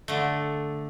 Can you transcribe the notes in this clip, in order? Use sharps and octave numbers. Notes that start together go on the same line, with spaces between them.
D3 A3